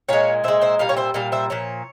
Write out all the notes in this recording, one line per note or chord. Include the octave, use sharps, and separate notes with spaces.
A#2 G#3 C#5 F5
A#2 G#3 C5 E5
C5 E5
A#2 G3 F5
C#5
C5 E5
A#2 G3 F5
C5 E5
A#2 F3 C#5